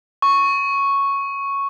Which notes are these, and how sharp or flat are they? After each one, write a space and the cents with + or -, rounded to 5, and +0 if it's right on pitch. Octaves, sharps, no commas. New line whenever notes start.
C#6 -5